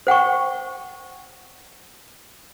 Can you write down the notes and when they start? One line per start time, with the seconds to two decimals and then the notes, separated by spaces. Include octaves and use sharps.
0.07 C5 F#5 G5 C#6